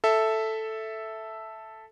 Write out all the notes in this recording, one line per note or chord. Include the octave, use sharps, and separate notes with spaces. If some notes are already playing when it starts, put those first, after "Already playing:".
A4 E5